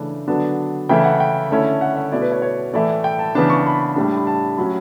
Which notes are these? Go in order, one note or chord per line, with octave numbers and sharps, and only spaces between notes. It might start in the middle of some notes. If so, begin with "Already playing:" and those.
Already playing: C#3 E3 A3 D4
D3 F#3 B3 D4 A5
C#3 E3 A3 E4 G5
F#5
G5
D3 A3 C#4 E4
F#5
E5
B2 A3 E4 D5
B4
C#5
C#5
A2 E3 A3 E4 D5
G5
A5
C#3 E3 B3 D4 A5
C#6
A5
B5
A2 G3 D4
B5
A5
A2 F#3 C#4 B5